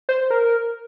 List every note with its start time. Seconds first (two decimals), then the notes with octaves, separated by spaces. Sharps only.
0.09 C5
0.30 A#4